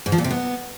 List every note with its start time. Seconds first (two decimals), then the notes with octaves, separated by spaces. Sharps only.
0.06 G#2
0.12 F3
0.18 A#2
0.24 C3
0.31 B3